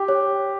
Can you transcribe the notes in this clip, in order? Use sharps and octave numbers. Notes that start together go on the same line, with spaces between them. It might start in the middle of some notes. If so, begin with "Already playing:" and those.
Already playing: G4
C#5